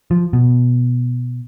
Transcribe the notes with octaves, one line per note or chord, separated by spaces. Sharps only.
F3
B2